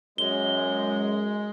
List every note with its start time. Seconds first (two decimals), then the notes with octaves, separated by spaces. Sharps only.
0.18 F#2 G#3 G7